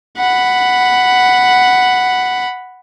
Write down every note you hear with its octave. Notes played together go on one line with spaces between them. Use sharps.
F#5 B5